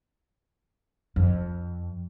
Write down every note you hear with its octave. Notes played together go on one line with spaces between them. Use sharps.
F2